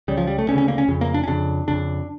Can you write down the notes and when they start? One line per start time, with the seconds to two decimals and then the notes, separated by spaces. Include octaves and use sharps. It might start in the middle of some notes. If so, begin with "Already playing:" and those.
0.08 C#2 C#3 G3
0.17 F3
0.27 G3
0.38 A3
0.48 D2 C#4
0.53 C#3
0.58 C#4
0.68 A#3
0.78 C#4
0.88 F2 C#3
1.01 A#3
1.14 D4
1.23 C#4
1.27 F2 C#3 D4
1.68 F2 C#3 D4